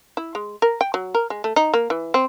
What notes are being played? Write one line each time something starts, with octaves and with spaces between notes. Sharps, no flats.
E4
G#3
A#4
G5
F#3
A#4
G#3
A3
D#4
A#3
E3
C4